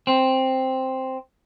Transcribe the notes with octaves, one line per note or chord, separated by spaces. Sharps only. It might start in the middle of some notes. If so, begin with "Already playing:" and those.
C4